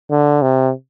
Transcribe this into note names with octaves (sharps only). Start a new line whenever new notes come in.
D3
C3